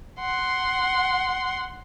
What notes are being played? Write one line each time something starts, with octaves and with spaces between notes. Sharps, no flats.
F#5 C6